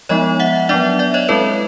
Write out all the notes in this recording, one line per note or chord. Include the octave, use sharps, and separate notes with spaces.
F3 G#3 B3 D#4 C#5 D#5
E5 F#5
F#3 B3 D4 D5 E5
D5 E5
C#5 D#5
G#3 C4 E4 A4 B4